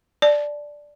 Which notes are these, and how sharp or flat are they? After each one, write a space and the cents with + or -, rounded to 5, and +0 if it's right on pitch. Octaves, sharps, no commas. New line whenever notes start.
D5 +0 A5 -20